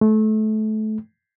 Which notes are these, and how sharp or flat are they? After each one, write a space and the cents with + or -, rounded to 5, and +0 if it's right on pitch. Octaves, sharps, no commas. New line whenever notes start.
A3 -25